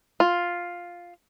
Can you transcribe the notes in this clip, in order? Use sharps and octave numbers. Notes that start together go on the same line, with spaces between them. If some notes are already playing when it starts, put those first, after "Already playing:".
F4